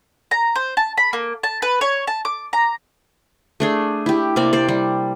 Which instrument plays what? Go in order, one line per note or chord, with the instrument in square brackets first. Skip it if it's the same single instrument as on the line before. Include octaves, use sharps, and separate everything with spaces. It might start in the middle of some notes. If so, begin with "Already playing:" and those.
[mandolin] A#5
C5
A5
B5
A#3
A5
B4
C#5
A5
D6
A#5
[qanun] A3 D4 G#4
E4 G4
C3 A#3 C4 D5
C5 D5
G3